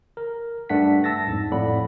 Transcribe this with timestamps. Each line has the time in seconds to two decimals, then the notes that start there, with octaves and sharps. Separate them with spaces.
0.17 A#4
0.69 G2 A3 D4 F#5 B6
1.04 A5 E6 A6 A#6
1.27 F2 G#2
1.51 F2 A2 D5 F#5 B5